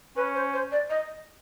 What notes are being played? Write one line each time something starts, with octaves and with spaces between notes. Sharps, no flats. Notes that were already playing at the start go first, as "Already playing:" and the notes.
C#4 B4
C5
C5
D5
D#5